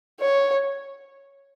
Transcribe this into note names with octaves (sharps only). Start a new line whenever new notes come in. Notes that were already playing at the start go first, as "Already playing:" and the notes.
C#5